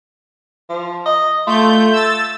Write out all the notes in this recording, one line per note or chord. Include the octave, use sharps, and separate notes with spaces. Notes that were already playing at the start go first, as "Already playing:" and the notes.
F3
D#5
A3 F4 G6
E6 A6